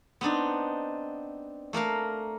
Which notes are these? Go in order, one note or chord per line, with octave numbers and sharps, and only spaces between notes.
B3 C4 D4 D#4
A3 A#3 A#4 F5